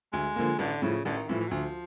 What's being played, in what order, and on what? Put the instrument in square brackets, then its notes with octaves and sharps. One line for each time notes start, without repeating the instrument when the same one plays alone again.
[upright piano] D2 [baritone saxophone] G#3
[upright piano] D3 F3 A#3
[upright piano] A1 [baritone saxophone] D3
[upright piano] A2 F3 [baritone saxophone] C#3
[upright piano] A1 [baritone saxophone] D3
[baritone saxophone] D#3
[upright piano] A2 F3 [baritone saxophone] E3
[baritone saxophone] E3
F#3
[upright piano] D2 [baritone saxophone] F3